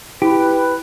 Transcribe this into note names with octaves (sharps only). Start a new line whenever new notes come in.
E4 G4 B4